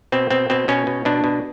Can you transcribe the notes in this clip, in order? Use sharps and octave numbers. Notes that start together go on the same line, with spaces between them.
B2 C4
B2 C4
B2 C4
B2 C#4
B2
B2 D4
B2